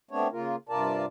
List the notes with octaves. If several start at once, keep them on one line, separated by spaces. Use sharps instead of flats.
A3 B3 C4 D4 C#5
C#3 A#3 F4 A#4
G2 C3 F4 A#4 D5 A5